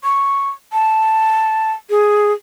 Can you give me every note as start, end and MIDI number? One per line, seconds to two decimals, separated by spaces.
0.04 0.50 85
0.73 1.72 81
1.90 2.32 68